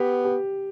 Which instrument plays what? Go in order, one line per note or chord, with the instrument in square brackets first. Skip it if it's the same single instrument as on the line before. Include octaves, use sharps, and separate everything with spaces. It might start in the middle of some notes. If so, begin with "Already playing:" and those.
Already playing: [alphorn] B3 [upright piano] G4
[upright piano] G4